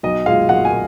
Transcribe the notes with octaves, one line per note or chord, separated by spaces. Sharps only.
B1 D#5
A#2 G#3 F5
B1 F#5
G#5
A#2